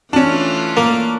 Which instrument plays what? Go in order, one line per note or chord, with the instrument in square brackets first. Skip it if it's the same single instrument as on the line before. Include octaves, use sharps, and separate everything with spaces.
[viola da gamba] E3 A3 F4 [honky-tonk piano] C#4 D4
[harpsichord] A#3